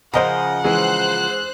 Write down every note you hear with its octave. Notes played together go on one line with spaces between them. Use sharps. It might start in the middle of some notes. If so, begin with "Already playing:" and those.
C#3 F3 A#4 C5 D#5 F#5 A#5
E3 G#3 C5 F#6